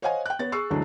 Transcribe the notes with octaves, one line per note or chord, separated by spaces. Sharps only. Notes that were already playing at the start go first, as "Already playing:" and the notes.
C5 C#5 D#5 F5 F#5 G#5
G5 F#6
B3 C#5 A6
G#4 C#6 E6 C7
D2 D3 E3 F#3 G#3 D4